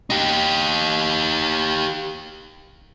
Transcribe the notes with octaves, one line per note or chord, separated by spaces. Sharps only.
D#4 G4